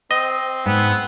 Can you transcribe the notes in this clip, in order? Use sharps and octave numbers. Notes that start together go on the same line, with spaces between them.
C4 D#5
G#2 B3